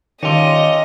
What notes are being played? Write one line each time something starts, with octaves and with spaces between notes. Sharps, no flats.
D#3 C#4 F4 G4 A4 D5 D#5